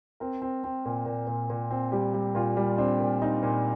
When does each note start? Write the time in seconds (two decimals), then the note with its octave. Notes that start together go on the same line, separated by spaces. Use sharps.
0.20 C4 A#4
0.42 C4
0.64 C4
0.86 A#2
1.06 A#2
1.27 A#2
1.50 A#2
1.71 C4
1.92 G3 G4
2.14 G3
2.35 A#2 F4
2.57 G3
2.78 C4 D4
3.00 A#2
3.22 C4 D#4
3.43 A#2